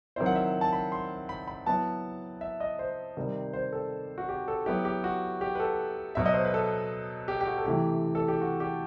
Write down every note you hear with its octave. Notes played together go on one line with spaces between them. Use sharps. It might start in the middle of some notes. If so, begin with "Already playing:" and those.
D#3 F#3 C4 E4 C5
F#5
E5
A5
B5
C6
B5
B5
F#3 B3 E4 A5
E5
D#5
C5
C3 D#3 G3
C5
A4
F#4
G4
A4
F#3 B3 E4 G4
G4
F#4
G4
B4
A4
B2 F#3 B3 E5
D#5
C5
B4
A4
G4
G4
F#4
A4
C3 E3 A3 E4 G4
A4
G4
F#4
G4